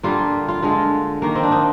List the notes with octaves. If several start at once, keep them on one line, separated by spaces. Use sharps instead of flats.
D3 G3 A#3 F4
F4
D3 G#3 F4
D#3 A#3
C4
D4
D#4